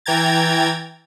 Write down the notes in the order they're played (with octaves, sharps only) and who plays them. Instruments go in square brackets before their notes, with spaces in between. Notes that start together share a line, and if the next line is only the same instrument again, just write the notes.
[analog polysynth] E3 G5 A#5 G#6 A6